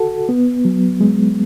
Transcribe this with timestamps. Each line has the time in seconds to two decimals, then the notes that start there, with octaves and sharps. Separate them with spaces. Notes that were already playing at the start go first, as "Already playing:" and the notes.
Already playing: F#4 A4
0.29 B3
0.65 F#3
1.01 G#3